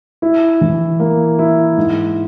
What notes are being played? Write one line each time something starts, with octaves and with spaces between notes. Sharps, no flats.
E4
E3
A#3
E4
G#2